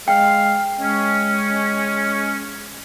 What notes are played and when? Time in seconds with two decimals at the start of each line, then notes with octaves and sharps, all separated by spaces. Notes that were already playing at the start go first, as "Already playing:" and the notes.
0.08 G#3 F5 G5
0.78 G#3 C#4